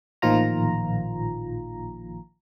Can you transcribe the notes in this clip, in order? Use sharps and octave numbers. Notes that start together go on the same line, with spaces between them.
A1 A#2 D#3 F3 F4 A#5